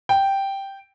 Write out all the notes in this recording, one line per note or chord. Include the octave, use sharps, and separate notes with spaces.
G5